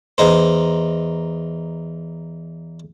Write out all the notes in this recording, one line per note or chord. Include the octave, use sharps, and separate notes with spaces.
E2 D#4 C5